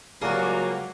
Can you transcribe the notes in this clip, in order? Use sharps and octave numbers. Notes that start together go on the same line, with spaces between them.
C#2 F#3 G3 A#3 F#4 G#4 A#4 D5